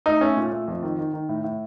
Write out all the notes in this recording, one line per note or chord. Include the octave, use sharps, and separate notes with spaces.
A3 D#4
A3 C#4
A#2
A3
F2
D#3
D#3
D#3
A2
A2